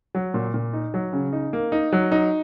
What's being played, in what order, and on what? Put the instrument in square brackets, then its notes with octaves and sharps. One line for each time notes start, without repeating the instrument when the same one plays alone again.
[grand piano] F#3
A#2
A#2
D#4
F#3
C#3
D#4
A#3
D#4
F#3
D#4